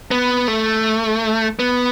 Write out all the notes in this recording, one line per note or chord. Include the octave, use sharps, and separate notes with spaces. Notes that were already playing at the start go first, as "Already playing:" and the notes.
B3
A3
B3